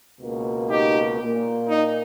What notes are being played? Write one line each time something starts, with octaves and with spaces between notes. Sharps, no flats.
C#2 B2 A#3
D#4 G4
A#2 A#3
D#4